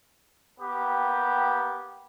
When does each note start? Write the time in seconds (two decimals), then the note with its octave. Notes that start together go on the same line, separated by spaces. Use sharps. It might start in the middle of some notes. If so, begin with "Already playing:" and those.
0.60 A#3 B3 G4 G5